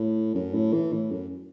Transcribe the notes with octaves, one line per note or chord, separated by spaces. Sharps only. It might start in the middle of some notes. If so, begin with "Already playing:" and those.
Already playing: A2
F#2
A2
E3
A2
F#2